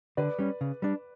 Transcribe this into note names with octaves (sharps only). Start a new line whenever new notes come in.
D3 B4 D5
G3 C#4
C#3
G3 D4